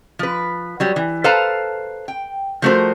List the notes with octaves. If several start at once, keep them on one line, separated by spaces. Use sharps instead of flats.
F3 B4
F#3 G3
E3
A4 B4 C5 F5 A5 A#5
G5
F3 G3 A3 F#4 A#4 C5